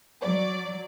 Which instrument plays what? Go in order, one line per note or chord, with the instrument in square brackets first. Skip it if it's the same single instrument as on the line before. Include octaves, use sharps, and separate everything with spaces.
[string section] F#3 D5